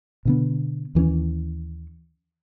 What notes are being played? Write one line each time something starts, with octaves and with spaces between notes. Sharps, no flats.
B2 D3 B3
D#2 E3 G#3 C#4